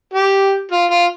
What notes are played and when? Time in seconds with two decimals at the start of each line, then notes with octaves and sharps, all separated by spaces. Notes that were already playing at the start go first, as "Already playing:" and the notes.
0.13 G4
0.71 F4
0.91 F4